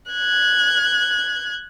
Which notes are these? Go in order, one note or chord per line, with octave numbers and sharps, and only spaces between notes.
F#6 G#6